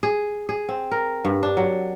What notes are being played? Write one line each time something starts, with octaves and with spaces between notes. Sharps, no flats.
G#4
G#4
C4
A#4
G2
D4
F#3